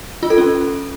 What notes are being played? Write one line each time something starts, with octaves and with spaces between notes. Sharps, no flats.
F4
A4
C#4